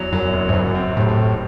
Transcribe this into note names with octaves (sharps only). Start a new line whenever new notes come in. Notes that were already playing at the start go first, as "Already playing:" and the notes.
Already playing: E2 F#3
F#2 F#3
F#1
G#2
F#2 F#3
C4
A2 C3
C3